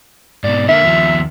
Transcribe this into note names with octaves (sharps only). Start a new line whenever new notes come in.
G#2 B2 D5
D3 A#3 E5
D#2 F3